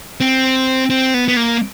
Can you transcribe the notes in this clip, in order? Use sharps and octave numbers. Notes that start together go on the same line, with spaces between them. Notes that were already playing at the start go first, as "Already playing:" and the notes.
C4
C4
B3
B3
A#3